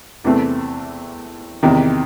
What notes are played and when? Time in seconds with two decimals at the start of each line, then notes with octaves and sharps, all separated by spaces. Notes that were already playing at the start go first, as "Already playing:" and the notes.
0.24 E2 C3 E3 A3 C4
1.63 E2 C3 D#3